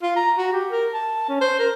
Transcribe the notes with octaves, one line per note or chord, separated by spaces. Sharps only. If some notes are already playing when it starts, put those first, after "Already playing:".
F4
A#5
F#4
G4
A#4
A5
C#4
C5
A#4